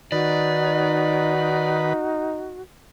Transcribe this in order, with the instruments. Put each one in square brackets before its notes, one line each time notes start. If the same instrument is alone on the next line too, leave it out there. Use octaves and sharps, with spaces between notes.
[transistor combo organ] D#3 B4 [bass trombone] D#4 [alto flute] F#4 [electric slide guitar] D5